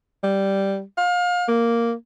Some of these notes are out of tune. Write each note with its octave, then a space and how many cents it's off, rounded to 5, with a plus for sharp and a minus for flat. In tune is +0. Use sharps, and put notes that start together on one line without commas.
G3 -5
F5 +30
A#3 -5